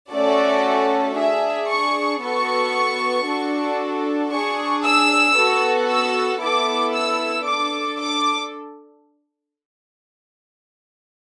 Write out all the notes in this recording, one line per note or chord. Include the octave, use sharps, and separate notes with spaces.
A3 C#4 F#4 A4 D5
D4 G#4 E5
C#6
B3 F#4 A4 C#6
D4 F#4 A4
D4 G#4 C#6
E6
B3 F#4 A4
E6
B3 E4 A4 D6
E6
D4 A4 D6
D6